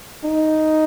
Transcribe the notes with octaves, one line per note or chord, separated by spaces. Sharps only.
D#4